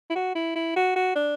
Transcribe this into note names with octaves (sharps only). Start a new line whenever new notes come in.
E4
F#4
E4
E4
F#4
F#4
D4